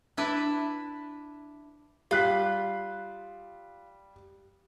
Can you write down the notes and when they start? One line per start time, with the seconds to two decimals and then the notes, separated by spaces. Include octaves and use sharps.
0.17 D4 E4 B4
2.11 G3 F4 F#6 B6